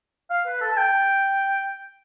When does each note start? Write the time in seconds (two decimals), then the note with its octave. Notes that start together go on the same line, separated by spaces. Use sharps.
0.30 F5
0.46 B4
0.61 A4
0.72 A5
0.77 G5